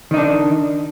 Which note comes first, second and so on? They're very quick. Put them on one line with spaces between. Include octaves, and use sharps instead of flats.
D#3 D#4 D4